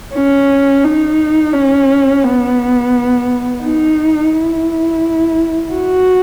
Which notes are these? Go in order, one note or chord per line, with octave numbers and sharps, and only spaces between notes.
C#4
D#4
C#4
B3
D#4
E4
F#4